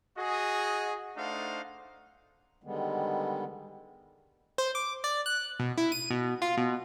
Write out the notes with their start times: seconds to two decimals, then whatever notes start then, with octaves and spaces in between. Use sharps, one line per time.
0.17 F#4 G#4 D#5
1.16 A3 D4 D#4 C5 F5 F#5
2.64 D3 D#3 G3 G#3 B3
4.58 C5
4.75 D6
5.04 D5
5.26 F#6
5.59 B2
5.78 E4
5.92 D#7
6.10 B2
6.42 F4
6.57 B2